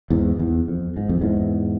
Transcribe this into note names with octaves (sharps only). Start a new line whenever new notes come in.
E2 G#2
E2
F2
G#2
F2
E2 G#2